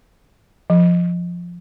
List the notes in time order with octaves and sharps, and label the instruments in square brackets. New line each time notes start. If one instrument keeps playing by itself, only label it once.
[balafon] F3